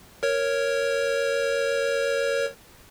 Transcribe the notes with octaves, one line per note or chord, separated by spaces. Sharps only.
A#4 C#5